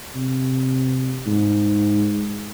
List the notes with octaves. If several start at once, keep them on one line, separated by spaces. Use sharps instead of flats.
C3
G#2